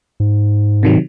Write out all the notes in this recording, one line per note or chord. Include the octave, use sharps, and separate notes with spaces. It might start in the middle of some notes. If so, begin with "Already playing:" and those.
G#2
C3 D#3 F#3